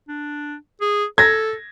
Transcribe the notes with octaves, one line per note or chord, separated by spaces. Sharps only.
D4
G#4
A4 G#6 A#6